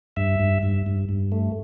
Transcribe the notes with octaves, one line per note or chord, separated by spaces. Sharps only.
G2 E5
G2
G2
G2
G2
A3